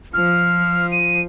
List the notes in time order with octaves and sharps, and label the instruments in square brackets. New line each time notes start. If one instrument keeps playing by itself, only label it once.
[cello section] F3 [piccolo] F6
[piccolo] D#7